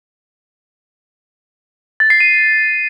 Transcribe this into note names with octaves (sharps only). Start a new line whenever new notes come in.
A6
C7
D#7